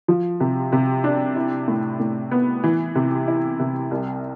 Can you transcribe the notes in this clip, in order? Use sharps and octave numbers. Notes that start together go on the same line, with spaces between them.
F3
C3
C3
D4
E4
A2
A2
B3
E3
C3
E4
C3
C2